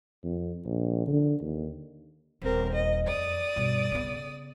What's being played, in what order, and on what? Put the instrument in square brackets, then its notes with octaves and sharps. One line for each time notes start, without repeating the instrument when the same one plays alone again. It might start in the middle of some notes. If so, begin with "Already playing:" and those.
[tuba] F2
A#1
D3
D#2
[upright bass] D#1 [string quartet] C4 A#4
[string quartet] D#5
[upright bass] F2 [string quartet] D5 D#6
[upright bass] G2 B2
C#3 B3